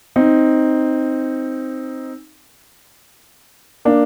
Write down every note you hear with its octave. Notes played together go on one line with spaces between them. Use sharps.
C4 D#4
A#3 D4